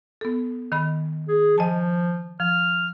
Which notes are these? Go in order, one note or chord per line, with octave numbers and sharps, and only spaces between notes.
B3 A4
D#3 D#5 B5
G#4
F3 D#5 G#5 A5
F3 F6